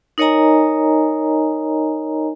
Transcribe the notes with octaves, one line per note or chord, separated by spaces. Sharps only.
D#4 A#4 C#5 D#5 G#5 A#5